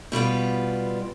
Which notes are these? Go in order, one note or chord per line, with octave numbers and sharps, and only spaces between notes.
B2 G3 B3 F4